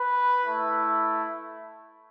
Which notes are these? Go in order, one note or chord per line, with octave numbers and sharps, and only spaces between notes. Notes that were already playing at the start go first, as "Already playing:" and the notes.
Already playing: B4
A3 E4